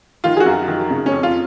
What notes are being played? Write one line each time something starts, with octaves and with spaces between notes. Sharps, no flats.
D#3 F4
G#4
F#4
F#2
D#3
C#3
C#4
F2
F4